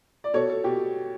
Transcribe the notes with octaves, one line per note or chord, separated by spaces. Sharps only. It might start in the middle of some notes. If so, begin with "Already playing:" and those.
D5
B2 A4 C#5
A4
B2 G4